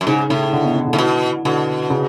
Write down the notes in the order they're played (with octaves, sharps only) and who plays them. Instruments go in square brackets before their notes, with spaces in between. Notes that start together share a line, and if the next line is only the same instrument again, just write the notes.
[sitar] F#2
[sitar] G#2 [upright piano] C#3
[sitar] A2 [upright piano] C#3
[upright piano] D3
B2
C#3
D3
[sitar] A2
[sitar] B2 [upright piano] E3
[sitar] B2 [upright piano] D3
[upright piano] C#3